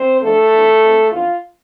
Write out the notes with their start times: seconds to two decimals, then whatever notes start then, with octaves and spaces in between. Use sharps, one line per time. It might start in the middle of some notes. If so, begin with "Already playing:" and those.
Already playing: C4 C5
0.22 G#2 F3 A3 B3 D4 A4
0.52 C3 E3 B3 D4
0.81 A2 G#3 C4
1.12 F2 E3 B3 D4 F4